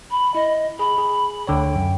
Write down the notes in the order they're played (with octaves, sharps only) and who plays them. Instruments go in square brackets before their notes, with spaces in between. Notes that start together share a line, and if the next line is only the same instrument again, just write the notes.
[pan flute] B5
[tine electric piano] E4 [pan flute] D#5
[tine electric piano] G#4 [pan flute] B5
[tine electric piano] G#4
[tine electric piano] D2 D3 C#5 [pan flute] G5
[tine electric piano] F#2